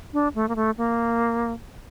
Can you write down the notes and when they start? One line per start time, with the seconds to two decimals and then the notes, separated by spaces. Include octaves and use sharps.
0.13 D4
0.35 A3
0.49 A#3
0.56 A3
0.78 A#3